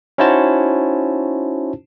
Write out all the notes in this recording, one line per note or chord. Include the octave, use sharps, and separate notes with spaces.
C#4 D#4 E4 F#4 C5 A5